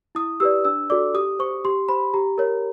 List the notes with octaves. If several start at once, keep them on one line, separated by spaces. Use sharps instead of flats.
E4 D#6
G4 B4 D5 E6
D4 E6
F#4 A4 D5 D6
G4 D#6
C5 C#6
G4 C6
C5 B5
G4 A#5
A#4 C#5